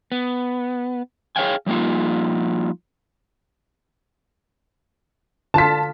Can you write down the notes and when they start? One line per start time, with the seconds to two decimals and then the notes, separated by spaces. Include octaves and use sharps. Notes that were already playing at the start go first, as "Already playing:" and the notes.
0.12 B3
1.36 G#4 C#5 D5 F5 G5 G#5
1.66 F3 G3 A#3 D#4 F4
5.54 D3 F4 A5 B6